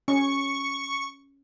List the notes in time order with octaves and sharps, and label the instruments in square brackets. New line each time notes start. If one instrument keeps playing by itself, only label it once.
[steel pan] C#4 [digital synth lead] C#6